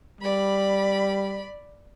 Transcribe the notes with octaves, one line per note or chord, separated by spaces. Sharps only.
G3 D5 B5